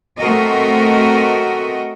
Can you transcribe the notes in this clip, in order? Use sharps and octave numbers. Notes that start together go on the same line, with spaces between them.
A3 C4 F#4 A#4 D#5